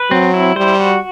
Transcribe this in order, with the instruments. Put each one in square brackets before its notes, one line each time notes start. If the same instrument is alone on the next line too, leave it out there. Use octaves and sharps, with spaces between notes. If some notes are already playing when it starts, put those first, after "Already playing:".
Already playing: [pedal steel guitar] B4
[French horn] F#3 [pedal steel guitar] C4
[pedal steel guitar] E4
[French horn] G3 [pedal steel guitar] C5
[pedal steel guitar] F#4